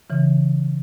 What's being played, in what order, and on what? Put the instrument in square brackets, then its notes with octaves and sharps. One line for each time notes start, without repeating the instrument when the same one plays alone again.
[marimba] C#3 E3